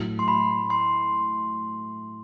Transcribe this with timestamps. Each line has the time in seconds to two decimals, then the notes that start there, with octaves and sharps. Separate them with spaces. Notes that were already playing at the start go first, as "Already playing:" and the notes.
Already playing: A2 F#3 A3
0.19 C6
0.28 B5
0.70 C6